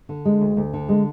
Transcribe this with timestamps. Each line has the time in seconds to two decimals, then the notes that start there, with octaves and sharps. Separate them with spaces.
0.09 D3
0.25 G#3
0.41 D2
0.57 D2
0.73 D3
0.89 G#3